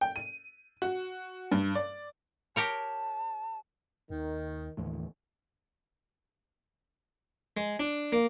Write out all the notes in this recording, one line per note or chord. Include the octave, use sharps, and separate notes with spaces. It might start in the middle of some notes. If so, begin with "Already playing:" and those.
G5
D#7
F#4
G2
D5
G4 A#4 C#5 A5
D#2 D#3
D#2 A2 D3 E3
G#3
D4
A#3